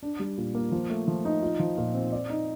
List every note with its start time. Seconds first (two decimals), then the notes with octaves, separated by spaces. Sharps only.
0.03 D4
0.19 G3
0.38 A#2
0.55 A#3
0.72 F3
0.90 A3
1.08 F3
1.25 D#4
1.42 F4
1.60 F3
1.78 A#2
1.94 C4
2.12 D5
2.30 D#4